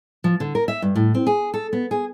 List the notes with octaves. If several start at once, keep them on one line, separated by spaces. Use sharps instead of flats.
F3
D3
A#4
E5
G2
A2
C4
G#4
A4
B3
G#4